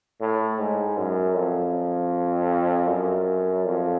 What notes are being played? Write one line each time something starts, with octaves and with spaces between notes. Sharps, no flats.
A2
G#2
F#2
F2
F#2
F2